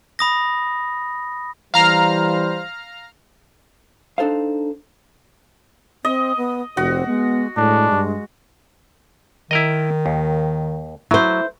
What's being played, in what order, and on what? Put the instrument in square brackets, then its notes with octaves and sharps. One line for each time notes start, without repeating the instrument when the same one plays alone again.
[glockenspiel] B5 D#6 A#6
[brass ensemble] E3 G3 C5 [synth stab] F5 A#5 F6
[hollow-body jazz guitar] D4 D#4 A4 C5 F5
[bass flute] C4 [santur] D#5
[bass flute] B3
[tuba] F1 [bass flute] C4 [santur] F#4
[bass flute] G#3 [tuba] B3
[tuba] A2 [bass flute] G#3 [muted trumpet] D4
[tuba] G2
[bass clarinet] D#3 [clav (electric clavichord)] E4 A#4 D#5
[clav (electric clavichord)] D#2
[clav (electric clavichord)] F#3 [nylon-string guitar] E4 C5